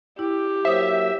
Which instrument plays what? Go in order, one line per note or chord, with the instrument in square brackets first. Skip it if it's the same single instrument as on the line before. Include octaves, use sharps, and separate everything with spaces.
[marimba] E4 [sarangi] G4
[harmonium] F#3 A#3 [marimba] C5 D#6 [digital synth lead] E5